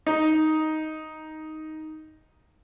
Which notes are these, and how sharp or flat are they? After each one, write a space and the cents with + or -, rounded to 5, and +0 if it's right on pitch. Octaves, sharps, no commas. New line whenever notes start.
D#4 +5